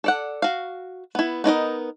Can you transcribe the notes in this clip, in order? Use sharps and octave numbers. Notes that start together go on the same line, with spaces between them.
A4 D5 F#5
F#4 F5
B3 E4
B3 D#4 A#4 D#5